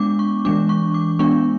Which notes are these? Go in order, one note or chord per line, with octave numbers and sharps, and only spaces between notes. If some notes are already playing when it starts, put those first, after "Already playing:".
Already playing: G#3 B3 D4 D6
C#6
E3 G#3 D4 D6
C#6
D6
G#3 B3 D4 C#6